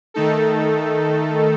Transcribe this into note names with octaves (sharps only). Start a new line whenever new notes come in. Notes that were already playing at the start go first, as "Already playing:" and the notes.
D#3 A3 D#4 A4